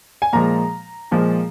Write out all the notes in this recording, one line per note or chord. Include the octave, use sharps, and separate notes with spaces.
G#5
A#2 F3 G#3 A#5
A#2 F3 G#3